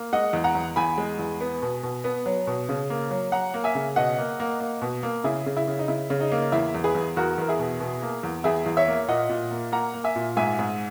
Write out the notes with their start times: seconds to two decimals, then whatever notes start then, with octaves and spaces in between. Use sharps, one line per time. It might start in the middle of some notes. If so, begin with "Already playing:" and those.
Already playing: A#3
0.13 G#3 D#5 F#5
0.33 E2
0.44 F#5 A#5
0.55 E2
0.76 E2 G#5 B5
0.98 G#3
1.19 E2
1.41 B3
1.62 B2
1.83 B2
2.04 B3
2.26 F#3
2.47 B2
2.69 C#3
2.90 A#3
3.11 F#3
3.32 F#3 F#5 A#5
3.54 A#3
3.64 E5 G#5
3.75 C#3
3.96 B2 D#5 F#5
4.18 A#3
4.40 A#3
4.60 A#3
4.82 B2
5.03 A#3
5.24 C#3 E4 G#4
5.46 C#3
5.57 E4
5.67 C#3
5.79 D#4
5.88 C#3 E4
6.10 C#3
6.21 D#4
6.32 A#3
6.52 E2 E4
6.75 E2
6.84 G#4 B4
6.95 E2
7.17 E2 F#4 A#4
7.38 E2 A#4
7.48 E4 G#4
7.59 B2
7.80 B2
8.02 A#3
8.23 E2
8.44 E2 E4 G#4
8.66 E2
8.77 C#5 E5
8.88 A#3
9.08 A#2 D#5 F#5
9.29 A#2
9.51 A#3
9.72 A#3 F#5 A#5
9.94 A#3
10.04 E5 G#5
10.16 A#2
10.36 G#2 E5 G#5
10.59 G#2